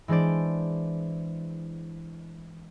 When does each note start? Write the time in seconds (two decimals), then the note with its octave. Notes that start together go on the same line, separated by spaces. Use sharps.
0.08 E3 G#3 D4 C5 D5